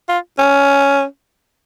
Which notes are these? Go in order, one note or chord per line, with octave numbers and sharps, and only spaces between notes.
F4
C#4